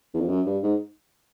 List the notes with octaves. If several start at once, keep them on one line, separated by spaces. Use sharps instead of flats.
E2
F2
F#2
G2
G#2